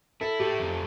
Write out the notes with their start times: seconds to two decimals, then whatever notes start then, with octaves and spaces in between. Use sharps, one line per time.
0.21 E4 A4
0.39 A3 G4
0.59 F2